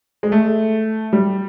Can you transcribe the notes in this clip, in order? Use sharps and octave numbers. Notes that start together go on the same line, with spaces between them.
G#3
A3
G3